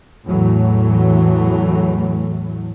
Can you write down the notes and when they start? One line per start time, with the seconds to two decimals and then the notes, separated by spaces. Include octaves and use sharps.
0.26 E2 A2 E3 F#3 A3